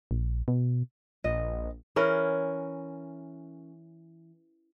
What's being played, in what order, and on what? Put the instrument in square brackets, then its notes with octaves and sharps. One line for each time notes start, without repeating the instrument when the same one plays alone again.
[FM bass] A#1
B2
[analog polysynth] A#1 [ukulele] D#5
[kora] E3 C#4 A#4